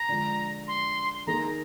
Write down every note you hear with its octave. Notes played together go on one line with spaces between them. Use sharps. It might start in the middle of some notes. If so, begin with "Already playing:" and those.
Already playing: A#5
D3 F3 G#3 D4
C6
D#3 A#3 D#4 G#4 A#5